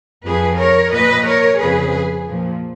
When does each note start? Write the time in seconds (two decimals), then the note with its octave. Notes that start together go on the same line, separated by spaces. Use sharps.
0.25 F2 F3 G#4 B4
0.59 A#4 C#5
0.93 A#2 F3 B4 D#5
1.26 A#4 C#5
1.60 F2 C#3 F3 G#4 B4
2.27 A#2 F3